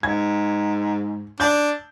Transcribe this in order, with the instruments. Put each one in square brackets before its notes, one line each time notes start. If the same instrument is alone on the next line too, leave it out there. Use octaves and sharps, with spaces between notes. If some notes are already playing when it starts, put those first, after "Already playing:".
[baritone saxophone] G#2 [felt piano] G#6
[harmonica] D4 [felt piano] G6